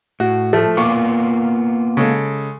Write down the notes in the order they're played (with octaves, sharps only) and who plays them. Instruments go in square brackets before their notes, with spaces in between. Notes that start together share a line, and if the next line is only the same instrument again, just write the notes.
[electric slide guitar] A2 [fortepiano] F#4
[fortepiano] F3 A3
[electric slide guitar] A#3 B3 F4 [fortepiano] C#6 D6
[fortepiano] C#3 G#3 A4